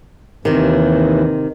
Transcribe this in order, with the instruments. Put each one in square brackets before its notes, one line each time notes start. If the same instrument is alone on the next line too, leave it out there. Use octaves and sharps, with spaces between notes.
[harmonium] D#2 E3 [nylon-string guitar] C3 D#3